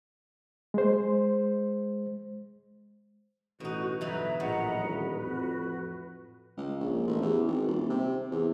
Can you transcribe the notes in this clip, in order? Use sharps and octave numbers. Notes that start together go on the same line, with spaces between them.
G#3 C5
A1 B2 D#4 F#4
G1 E3 F#3 D#4 B4 E5 A#5
A#1 A2 B4 D#5 F#5 A#5
D#1
F2 F#4
C#2
A#1
A1
E2
G#1
D#1
C3
E2